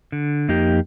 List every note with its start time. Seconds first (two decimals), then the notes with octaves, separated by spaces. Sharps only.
0.12 D3
0.48 F2 A#3 D#4 G4